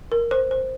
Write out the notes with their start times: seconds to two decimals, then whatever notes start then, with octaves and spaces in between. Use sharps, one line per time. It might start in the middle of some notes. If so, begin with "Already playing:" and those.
0.12 A#4
0.31 C5
0.51 C5